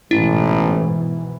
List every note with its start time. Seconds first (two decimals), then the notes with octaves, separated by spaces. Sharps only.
0.11 A1 G#2 B2 E3 E4